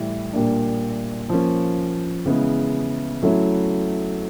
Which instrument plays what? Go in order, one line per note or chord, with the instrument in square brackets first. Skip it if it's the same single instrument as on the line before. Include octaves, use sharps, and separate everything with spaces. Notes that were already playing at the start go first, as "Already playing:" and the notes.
Already playing: [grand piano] A2 E3 G3
A#2 G3 A#3 D4
F3 A#3 C#4
C#3 E3 G#3 B3
F#3 A3 C#4 E4